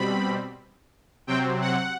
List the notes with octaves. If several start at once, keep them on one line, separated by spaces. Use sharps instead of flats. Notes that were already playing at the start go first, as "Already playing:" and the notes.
Already playing: B2 G3 C4 B5
C3 F#3 C4 G5
F#5